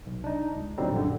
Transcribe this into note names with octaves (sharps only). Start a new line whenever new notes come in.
B1
D4 D#4
C#2
A#2 D3 F#3 G3 C4 D#4
A#1 F#2 D3